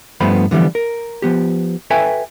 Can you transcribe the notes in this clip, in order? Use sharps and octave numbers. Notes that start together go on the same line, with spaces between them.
G2 F3 A3 B3 C5 B5
D3 E3 F3 G3 B3
A#4
F3 B3 G4
F#4 A4 B4 E5 G5 G#5